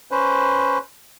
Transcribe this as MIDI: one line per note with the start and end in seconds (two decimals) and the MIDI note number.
0.11 0.78 61
0.11 0.78 71
0.11 0.78 72